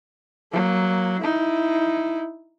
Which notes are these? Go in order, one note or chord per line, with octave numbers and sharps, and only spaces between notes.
F#3 A#3
D#4 E4